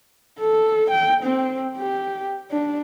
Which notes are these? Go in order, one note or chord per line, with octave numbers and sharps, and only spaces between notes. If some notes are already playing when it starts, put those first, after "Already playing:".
A4
G5
C4
G4
D4